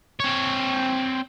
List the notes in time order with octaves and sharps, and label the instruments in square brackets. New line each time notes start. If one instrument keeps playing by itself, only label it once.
[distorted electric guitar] C4 C#5